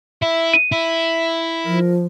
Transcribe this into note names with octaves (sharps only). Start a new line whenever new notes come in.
E4 E5
D#7
E4 E5
F3 A#4